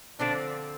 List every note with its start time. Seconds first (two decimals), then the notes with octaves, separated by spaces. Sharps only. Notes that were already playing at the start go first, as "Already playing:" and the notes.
0.20 D3 F3 C4 D4